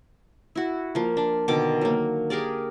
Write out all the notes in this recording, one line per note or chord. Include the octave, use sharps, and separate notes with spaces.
E4 F#4
F3 A#3
D4
B2 D3 D#3 D6
F#3 A#3
G4 G#4 A#4 D5